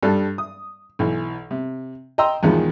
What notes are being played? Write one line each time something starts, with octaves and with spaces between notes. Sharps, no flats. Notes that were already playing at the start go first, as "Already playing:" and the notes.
G2 G3 A4
D#6
B1 E3
C3
D#5 G5 A#5 C6 E6
E2 B2 D#3 F3 G#3